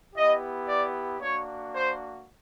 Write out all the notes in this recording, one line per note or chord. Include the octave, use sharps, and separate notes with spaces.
B3 E4 G4 D#5
D5
A#3 D4 F#4 C#5
C5